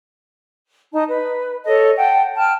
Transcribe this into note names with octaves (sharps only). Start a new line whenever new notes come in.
D#4 D#5 A5
B4
A4 C#5 D#5 A5
F#5 G5 A5
G5 A5 F6